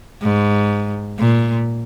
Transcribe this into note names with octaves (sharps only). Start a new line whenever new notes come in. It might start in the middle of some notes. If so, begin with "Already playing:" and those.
G#2
A#2